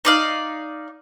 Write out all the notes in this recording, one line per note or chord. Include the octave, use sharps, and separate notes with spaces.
D#4 D5 F5